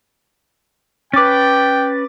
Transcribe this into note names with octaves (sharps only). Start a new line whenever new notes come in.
C#4 B4 G5 D6 A6